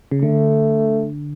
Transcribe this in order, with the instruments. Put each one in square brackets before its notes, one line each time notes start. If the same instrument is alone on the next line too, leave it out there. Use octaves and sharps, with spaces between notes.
[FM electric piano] C#3
[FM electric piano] D3 [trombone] A3